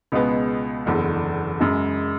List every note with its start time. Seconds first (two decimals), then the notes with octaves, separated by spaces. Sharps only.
0.12 C#2 B2 G#3 B3
0.86 F#1 E2 D3
1.60 F#2 C#3 G#3